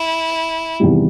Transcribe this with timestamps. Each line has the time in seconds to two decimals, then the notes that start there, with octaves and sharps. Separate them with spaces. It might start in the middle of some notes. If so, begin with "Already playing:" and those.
Already playing: E4
0.80 E2 C3 D#3 G3